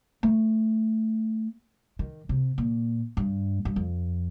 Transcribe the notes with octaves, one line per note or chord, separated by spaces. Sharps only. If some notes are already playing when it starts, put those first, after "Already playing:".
A3
D#3
C3
A#2
G2
G2
F2